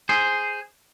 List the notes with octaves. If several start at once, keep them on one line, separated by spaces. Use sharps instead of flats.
G#4 C5